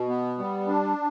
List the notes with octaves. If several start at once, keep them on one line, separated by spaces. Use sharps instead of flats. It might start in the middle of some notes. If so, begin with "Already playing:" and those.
Already playing: B2
B3
G3
D4